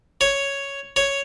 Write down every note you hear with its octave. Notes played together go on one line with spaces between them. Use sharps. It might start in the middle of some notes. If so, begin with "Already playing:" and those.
C#5
C#5